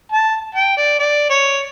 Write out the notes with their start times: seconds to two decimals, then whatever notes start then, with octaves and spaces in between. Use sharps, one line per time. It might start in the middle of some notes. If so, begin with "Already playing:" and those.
0.12 A5
0.55 G5
0.77 D5
0.99 D5
1.30 C#5